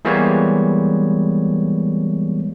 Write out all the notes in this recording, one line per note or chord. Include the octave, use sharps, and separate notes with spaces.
E3 G3 G#3 A#3 B3 C#5